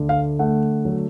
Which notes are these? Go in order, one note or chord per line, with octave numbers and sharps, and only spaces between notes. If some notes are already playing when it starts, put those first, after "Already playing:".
Already playing: D2 D3
F5
A3 F#5
F#3